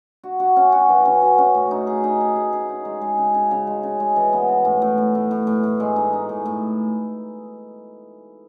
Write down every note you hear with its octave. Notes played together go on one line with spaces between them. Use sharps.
F#4
F#4
C#4
F#4
E3
C#4
F#4
C#4
A2
D#4
G#4
D#4
G#4
G#4
G#4
D#4
G#3
G#3
C#3
C#3
C#3
G#3
C#3
G#3
E3
B3
E3
A2
A2
A2
A2
A2
A2
A2
G#3
D#4
D#4
A2
A2